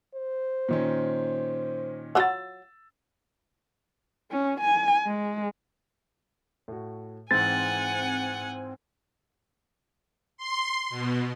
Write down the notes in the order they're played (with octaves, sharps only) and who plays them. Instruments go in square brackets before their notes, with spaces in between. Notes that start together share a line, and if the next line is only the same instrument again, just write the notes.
[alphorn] C5
[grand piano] A#2 D#3 C#4
[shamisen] F#3 F4 F#4 [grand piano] E6 A6
[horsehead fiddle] C#4
G#5
G#3
[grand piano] A2 F#4
[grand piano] G#2 E3 [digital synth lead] C4 [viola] F#5 G#5 [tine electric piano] A6
[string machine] C6
B2